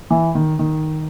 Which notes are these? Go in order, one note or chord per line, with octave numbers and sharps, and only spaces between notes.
E3
D#3
D#3